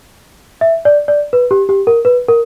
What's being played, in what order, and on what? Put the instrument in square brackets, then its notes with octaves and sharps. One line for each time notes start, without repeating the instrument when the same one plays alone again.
[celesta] E5
D5
D5
B4
G4
G4
A#4
B4
A#4